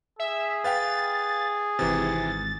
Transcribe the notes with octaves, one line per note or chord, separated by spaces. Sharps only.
G#4 E5
B4 F5 G5 A6
G#1 C3 E3 A6